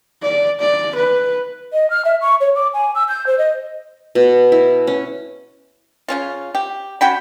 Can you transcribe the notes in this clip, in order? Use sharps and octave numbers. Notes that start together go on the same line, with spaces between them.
D5
D5
B4
D#5
F6
E5
C#6
C#5
D6
G#5
E6
G6
C5
D#5
B2
E4
C#4
C#3 C#4 F4
G4
C#4 F#4 G5 B5